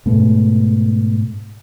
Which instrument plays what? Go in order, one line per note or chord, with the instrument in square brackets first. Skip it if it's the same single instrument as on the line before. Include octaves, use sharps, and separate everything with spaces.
[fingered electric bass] G#2 B2 A3